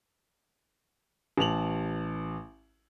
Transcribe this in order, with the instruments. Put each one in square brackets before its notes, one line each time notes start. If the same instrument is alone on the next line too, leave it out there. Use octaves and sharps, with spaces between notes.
[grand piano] A1 A5 F7 F#7